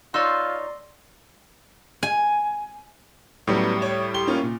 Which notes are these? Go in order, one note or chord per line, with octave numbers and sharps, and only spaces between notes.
D#4 F4 C#5 D5 C6 E6
G#5
A2 F#3 G3 B3 C#4
C#5
G4 C6 G7
A#3 C#4 F4
A#2